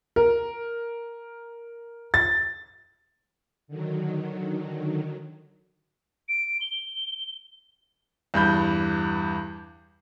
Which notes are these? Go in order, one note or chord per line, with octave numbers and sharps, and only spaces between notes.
A#4
A6
D3 D#3 F#3
D7
G7
E2 G2 B5 G6